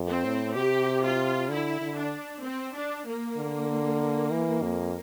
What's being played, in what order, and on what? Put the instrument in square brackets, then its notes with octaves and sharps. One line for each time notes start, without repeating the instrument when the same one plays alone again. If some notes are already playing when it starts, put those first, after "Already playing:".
Already playing: [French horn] F2
[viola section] C4
[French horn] A2
[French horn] C3 [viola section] G4
[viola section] F4
[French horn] D3 [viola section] E4
[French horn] D3
[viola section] D4
C4
D4
A#3
[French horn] D3
E3
F2